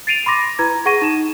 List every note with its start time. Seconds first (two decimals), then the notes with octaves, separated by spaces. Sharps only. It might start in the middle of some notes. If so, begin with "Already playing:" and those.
0.07 A6 C7 D7 D#7 F7
0.26 B5 C6 D6 A#6
0.59 E4 B4 A#5 G#6
0.85 G#4 F#5 C#6 A#6 D#7
1.02 D#4 E7